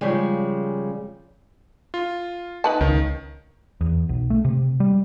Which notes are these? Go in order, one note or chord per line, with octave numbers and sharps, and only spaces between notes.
C#3 F3 G3 G#3
F4
D#4 B4 A5
C#2 D#3
E2
B1
A3
C3
G3